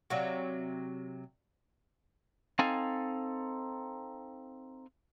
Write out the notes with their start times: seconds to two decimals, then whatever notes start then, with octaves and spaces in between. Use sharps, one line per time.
0.10 C3 F#3 D5 F5 F#5
2.59 C4 D#4 A4 F5 G#5